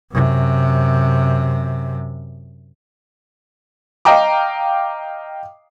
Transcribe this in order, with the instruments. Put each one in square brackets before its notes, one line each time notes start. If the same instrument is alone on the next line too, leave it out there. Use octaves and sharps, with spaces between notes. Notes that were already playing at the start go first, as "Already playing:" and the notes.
[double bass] F#2 C3
[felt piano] D#5 F5 G5 A#5 D6